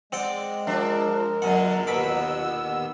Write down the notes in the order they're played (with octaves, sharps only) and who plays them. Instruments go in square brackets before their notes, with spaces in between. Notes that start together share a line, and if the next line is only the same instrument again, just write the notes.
[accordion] G#3 [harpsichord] C4 F#5 G5 [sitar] D5
[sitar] F3 D4 E5 [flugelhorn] A#4
[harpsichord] F#2 F#5 [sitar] A#2 D3
[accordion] D#2 B3 E6 [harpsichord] B2 B5 D6